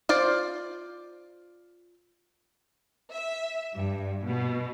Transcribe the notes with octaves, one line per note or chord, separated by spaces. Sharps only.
F4 C5 D5
E5
G2
B2